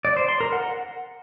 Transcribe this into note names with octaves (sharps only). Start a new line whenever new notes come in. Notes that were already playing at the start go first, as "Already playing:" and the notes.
D5
C5
C6
A#4
F#5